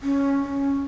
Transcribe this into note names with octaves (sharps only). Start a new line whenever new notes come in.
C#4
C#4